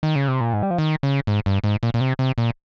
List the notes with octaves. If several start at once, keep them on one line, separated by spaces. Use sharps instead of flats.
D#3
C#3
C3
A#2
G#2
G3
F3
D#3
C#3
G#2
G2
G#2
A#2
A#2
C3
C3
A#2